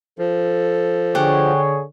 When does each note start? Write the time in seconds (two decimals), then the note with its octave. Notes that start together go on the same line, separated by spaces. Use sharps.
0.19 F3 A4
1.15 D3 G4 G#4 C#5 F#5